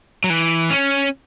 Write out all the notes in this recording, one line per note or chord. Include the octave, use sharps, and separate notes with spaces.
F#3
E3
C#4